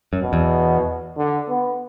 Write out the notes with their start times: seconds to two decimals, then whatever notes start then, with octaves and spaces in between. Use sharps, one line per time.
0.13 F#2
0.22 B2
0.33 E2
1.17 D3
1.49 B3